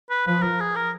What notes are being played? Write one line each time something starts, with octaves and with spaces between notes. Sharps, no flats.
B4
F3 B4
A#4
G#4
A#4